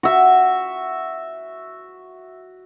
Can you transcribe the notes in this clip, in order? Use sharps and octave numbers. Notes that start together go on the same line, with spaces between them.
F#4 E5